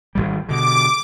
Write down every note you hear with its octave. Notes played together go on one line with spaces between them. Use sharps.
G#1 C#2 G3
B2 D3 D6